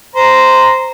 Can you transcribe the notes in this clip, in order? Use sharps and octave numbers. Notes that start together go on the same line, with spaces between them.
C5 A#5